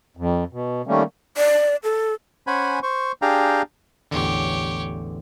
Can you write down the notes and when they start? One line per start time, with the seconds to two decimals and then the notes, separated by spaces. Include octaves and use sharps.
0.17 F2
0.53 B2
0.87 D#3 G3 A3 A#3 C#4
1.37 D5
1.84 A4
2.47 C#4 C5 F#5 G#5 B5
2.83 C5 C#6
3.22 D4 G4 G#4 F5 G5 A#5
4.11 A1 E2 D3 G4 C#5